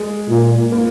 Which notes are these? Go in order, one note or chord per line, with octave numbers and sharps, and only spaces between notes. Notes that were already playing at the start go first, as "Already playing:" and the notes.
Already playing: G#3
A#2
A#3